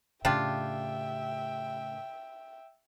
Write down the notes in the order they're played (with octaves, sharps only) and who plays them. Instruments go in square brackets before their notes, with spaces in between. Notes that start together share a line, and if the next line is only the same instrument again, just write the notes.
[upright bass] A2 C#3 [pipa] D4 F4 [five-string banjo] G4 [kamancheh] E5 G5